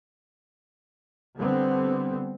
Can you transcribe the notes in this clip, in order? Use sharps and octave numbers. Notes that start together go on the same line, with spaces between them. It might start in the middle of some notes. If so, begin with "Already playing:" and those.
D3 G3 B3 C4